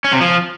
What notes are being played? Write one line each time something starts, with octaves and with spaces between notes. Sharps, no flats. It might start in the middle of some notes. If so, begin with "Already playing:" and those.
C#4
C3
F3